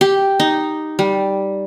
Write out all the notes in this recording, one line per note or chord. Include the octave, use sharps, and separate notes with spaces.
G4
D#4
G3